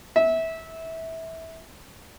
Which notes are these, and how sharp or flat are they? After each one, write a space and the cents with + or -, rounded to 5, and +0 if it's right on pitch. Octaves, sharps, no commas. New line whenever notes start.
E5 -20